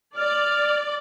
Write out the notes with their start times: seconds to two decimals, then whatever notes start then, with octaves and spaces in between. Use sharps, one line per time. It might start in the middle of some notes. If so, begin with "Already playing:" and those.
0.17 D5 F6